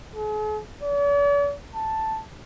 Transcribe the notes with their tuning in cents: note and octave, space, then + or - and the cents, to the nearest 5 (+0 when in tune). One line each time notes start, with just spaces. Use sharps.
G#4 +45
D5 -45
A5 +0